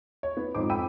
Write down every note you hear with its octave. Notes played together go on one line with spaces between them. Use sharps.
C#5
B3
F2 G#2 D#4 C5 D6
G5 B5 E6 D#7